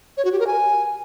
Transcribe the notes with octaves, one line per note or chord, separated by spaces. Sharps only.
C#5
F#4
G4
A#4
G#5